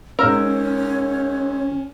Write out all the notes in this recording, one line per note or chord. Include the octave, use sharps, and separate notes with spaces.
G#2 C#4 A#4 C#5 E6